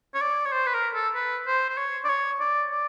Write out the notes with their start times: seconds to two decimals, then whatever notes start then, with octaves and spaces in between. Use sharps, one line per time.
0.15 C#5
0.21 D5
0.46 C#5
0.52 C5
0.67 B4
0.74 A#4
0.95 A4
1.15 B4
1.47 C5
1.69 C5
1.78 C#5
2.04 D5
2.09 C#5
2.41 D5
2.71 D5